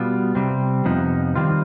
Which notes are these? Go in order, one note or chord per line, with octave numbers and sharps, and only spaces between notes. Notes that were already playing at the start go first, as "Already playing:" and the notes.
Already playing: B2 G3 B3 F4
C3 G3 C4
F2 C3 F3 B3 D#4
D#3 G3 C4 F4